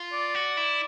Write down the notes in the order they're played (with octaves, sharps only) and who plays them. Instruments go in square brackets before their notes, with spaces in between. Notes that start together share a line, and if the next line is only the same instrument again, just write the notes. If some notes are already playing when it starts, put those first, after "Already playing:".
Already playing: [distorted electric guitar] F4
[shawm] D5
[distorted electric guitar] F#4
E4